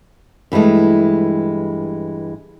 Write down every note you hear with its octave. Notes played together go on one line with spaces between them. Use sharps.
G2 E3 F3 G#3 A3